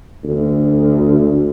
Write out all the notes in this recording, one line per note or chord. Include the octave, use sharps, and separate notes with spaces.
D2